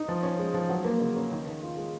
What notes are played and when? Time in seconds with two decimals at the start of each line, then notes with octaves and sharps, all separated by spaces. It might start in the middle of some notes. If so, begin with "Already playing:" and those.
Already playing: D#4
0.08 F3
0.23 C#4
0.39 G#3
0.54 F3
0.69 F#3
0.84 A#3
1.00 C#3
1.16 C#4
1.32 D#3
1.47 D#3
1.62 F4
1.77 G#3